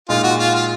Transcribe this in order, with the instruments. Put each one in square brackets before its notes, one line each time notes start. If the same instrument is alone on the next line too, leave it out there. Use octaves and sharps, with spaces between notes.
[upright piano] A#2 G#3 D#4 [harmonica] F4
[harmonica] F#4
F4
F4